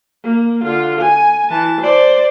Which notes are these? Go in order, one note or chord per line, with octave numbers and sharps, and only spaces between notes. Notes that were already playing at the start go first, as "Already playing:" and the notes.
A#3
D3 F4
G#5
E3 A5
C5 D5